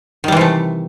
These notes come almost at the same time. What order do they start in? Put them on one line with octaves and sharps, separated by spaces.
D#3 G3 E3 C3 A3